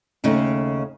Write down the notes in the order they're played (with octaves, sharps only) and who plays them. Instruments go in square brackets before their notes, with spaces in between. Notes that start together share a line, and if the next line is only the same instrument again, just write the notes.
[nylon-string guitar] D#2 C#3 A3 D#4